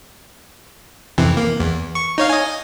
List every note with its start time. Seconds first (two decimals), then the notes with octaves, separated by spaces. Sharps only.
1.18 F2 C3 E3
1.37 A#3
1.60 E2
1.95 C#6
2.18 D#4 C#5 F5
2.29 D#5 G#5